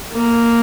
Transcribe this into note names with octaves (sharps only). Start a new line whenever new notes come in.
A#3